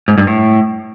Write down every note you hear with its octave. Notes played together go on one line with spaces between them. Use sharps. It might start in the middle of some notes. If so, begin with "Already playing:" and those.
G#2
G2
A2